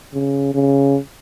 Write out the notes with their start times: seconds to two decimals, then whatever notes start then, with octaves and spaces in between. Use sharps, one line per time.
0.14 C#3
0.55 C#3